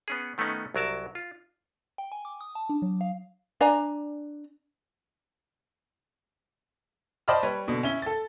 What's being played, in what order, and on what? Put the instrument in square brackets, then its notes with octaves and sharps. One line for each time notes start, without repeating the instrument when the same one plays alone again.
[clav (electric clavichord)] B3 C#4 G#4
D#3 A3 B3 C#4 D#4
C2 F#3 A#4 A5
F4
[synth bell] G5
G#5
D6
D#6
A5
D4
F#3
F5
[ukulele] D4 D5 G#5 A#5
[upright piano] C5 D5 D#5 A5 B5 F6
G3 B4 C#5
B2 D3
C#4 E4 G7
A4 A6